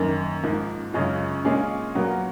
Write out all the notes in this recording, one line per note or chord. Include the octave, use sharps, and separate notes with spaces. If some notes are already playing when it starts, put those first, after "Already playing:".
Already playing: F#2 D#3 A#3
G#2 F3 A#3
F#2 C#3 G#3 C#4 F4
A#2 G#3 C#4 F4 G#4
A#2 F#3 B3 F#4 A#4